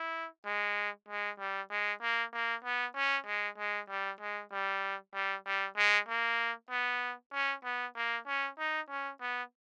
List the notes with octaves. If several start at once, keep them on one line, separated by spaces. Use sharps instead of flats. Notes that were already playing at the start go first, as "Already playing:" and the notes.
Already playing: E4
G#3
G#3
G3
G#3
A#3
A#3
B3
C#4
G#3
G#3
G3
G#3
G3
G3
G3
G#3
A#3
B3
C#4
B3
A#3
C#4
D#4
C#4
B3